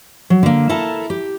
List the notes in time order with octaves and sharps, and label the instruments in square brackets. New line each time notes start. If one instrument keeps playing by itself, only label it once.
[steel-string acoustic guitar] F#3
D3 A#3
E4 A4 A#4 A5
G4